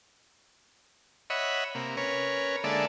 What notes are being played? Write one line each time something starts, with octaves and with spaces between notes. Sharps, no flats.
C#5 D#5 E5 F#5 B5
C3 A#3
C#4 A#4 B4 C#5
D3 G#3 A#3 A4 D5 E5